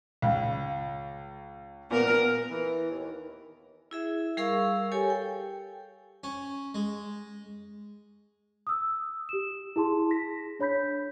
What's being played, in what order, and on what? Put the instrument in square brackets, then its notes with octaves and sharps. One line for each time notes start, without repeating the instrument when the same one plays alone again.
[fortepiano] C#2
[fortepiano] A#2 [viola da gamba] B3 A#4
[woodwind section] E3
D#2
[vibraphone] E4 G#4 E5
G3 G#4 A#4 F5 C#6 E6
G4 A4 C#5 G#5
G5
[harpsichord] C#4
G#3
[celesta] D#6 E6
G4 E7
E4 G#4 A5 C6
A#6 B6
D4 C#5 B5 G6 B6